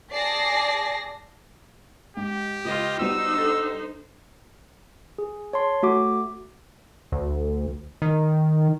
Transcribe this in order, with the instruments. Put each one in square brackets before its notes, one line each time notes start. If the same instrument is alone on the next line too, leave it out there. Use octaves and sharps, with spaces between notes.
[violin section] G#4 D5 A5 A#6 C7
[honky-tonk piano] G#2 [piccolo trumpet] G4
[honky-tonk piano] C#2 [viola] F4 D#5
[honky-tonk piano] G3 B3 F#4 [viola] D#4 C5 [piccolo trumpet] E6
[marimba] D4 A4
[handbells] G#4
C#5 A5 C6
A3 F#4 D6
[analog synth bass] D2
D#3